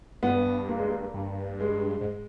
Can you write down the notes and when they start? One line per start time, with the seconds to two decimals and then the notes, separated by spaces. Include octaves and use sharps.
0.23 G2 B3
0.69 A#3
0.78 G#3
0.88 A#3
1.14 G2
1.60 G#3
2.00 G#2